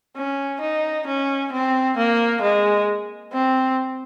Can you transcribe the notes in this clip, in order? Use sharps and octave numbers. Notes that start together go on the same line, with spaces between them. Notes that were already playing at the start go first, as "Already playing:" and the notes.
C#4
D#4
C#4
C4
A#3
G#3
C4